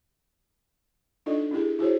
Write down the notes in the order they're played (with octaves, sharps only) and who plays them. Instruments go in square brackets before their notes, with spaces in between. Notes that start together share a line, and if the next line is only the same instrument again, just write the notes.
[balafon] D4 D#4 F4 A4 D5 D#5
C#4 E4 G4 G#4
E4 F#4 G#4 C5 C#5